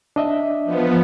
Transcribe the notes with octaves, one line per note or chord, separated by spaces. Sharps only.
D4 D#5 E5
F3 B3